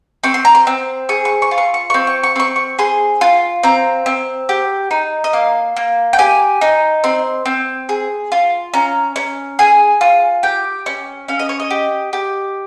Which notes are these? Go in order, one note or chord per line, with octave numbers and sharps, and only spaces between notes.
C4 C#6
C6
A#5
C6
C4
G#4 C#6
C#6
C#6
F4
C#6
C#6
C#6
C4
C#6
C#6
C4 C#6
C#6
G#4 C6
F4
C4 A#5
C4
G4
D#4
D#5
A#3 F5
A#3
G5
G4 G#5
D#4
C4 C6
C4
G#4
F4
C#4 A#5
C#4
G#4 G#5
F4
G4 G5
C#4
C#4 F5
D#5
C#5
D#5
G4
G4